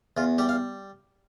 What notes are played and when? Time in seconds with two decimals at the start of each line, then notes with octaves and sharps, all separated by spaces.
0.17 E2 F4
0.38 G3 G4
0.49 F5